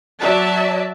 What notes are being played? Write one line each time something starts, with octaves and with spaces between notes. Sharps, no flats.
F#3 D5 E5 A5